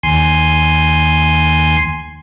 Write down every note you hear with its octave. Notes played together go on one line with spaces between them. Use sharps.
D#2 G#5 C6